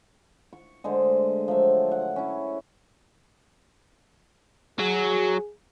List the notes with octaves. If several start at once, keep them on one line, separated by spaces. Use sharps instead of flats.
C#6
D3 G#3 A3 C5
F3 F#3 E5
F#5
C#4 E4
F#3 G#4